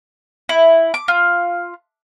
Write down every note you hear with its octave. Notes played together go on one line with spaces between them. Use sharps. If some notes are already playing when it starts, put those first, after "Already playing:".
E4
D6
F4